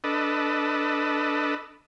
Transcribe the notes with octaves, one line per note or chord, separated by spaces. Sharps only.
D4 A4 B4 D#5